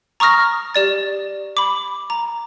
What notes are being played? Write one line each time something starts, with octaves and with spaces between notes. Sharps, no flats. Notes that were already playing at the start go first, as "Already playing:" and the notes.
A#5 C#6 D#6 F6 A#6
G4 D5 A6
B5 D6
A#5